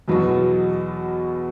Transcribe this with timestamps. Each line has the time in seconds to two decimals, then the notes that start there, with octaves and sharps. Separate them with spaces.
0.08 E2 B2 F#3 B3 F#4